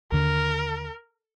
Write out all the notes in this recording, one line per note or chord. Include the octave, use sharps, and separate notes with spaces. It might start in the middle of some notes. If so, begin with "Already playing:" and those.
D#2 D3 A#4